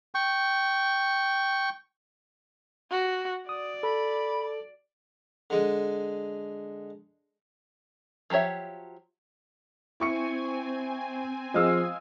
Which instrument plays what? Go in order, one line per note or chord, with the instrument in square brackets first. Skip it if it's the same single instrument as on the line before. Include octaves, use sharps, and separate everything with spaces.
[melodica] G5 C#6
[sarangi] F#4
[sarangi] D5 [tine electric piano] D#6
[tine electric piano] A4 [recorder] B5
[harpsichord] D3 G#3
[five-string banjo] F3 F#3 G4 C#5 E5
[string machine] C4 G#5 [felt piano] E4 C#6 C#7
[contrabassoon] F3 [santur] G#3 F5 E6 [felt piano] G#4 D#5